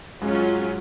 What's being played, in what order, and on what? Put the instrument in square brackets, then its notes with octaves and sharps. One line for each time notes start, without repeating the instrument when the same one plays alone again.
[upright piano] G#2 G#3 [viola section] F#3 C#4 F4